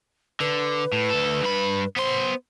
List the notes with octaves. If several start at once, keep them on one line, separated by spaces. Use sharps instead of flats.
D3 B4
A2
D2 A4
G2 B5
B3 C5 C6